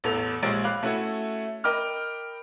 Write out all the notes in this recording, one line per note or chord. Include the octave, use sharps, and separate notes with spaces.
A1 E2 A4 F7
A#1 G#3 G4 C#5 A6 D7
F5 B5 D6 F#6
A3 C#4 E4 F#4
A#4 D#5 G5 B5 D6 F6